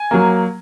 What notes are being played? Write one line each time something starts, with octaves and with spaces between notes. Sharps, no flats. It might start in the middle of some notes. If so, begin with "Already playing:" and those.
Already playing: G#5
F#3 A#3